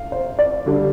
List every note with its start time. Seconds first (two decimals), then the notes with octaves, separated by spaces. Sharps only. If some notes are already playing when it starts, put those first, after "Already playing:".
Already playing: F5
0.12 C5
0.39 D5
0.66 D3 G3 D4